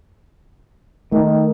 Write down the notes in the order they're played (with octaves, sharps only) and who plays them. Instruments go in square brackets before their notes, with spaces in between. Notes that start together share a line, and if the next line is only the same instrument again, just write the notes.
[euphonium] D#3 [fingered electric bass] A3